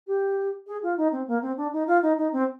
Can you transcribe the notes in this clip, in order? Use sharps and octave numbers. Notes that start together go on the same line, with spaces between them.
G4
G#4
F4
D#4
C4
A#3
C4
D4
D#4
F4
D#4
D#4
C4